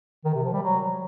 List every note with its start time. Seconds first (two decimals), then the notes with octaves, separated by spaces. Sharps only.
0.24 D#3
0.34 C3
0.43 F3
0.53 G3
0.62 F#3